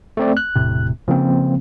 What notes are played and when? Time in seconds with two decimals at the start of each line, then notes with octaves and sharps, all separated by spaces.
0.17 A3 C4 D5
0.37 F#6
0.55 E1 A2 C3
1.08 C#3 F3 A#3 C4